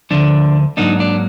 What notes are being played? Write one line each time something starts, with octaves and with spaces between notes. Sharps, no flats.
D2 D3 F3 D4
G#2 F#3 A#3 D4 D#4
D4